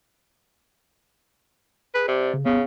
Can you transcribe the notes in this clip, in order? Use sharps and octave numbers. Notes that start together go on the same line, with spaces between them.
G#4 B4
C3 D5
C#3
C#3 B3